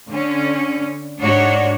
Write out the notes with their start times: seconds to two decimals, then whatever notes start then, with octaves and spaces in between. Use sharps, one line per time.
0.11 D3 C#4
1.19 G#2 D4 F#4 C#5